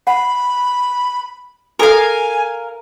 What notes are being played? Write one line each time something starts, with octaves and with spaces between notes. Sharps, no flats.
F#5 B5
F#4 A4 A#4 F5 G#5